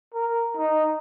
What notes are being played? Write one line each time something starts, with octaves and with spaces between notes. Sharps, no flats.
A#4
D#4